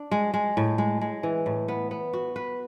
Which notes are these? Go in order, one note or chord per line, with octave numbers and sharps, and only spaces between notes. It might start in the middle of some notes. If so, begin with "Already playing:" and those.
Already playing: D4
G#3
G#3
A2
G#3
G#3
E3
A2
B3
B3
F#4
B4